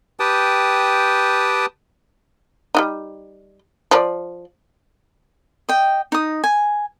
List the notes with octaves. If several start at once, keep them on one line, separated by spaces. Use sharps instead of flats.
G4 B4 G5 A5 D#6
G3 D4 D#4
F3 A#4 D5
D#5 G5
D#4 D#6
G#5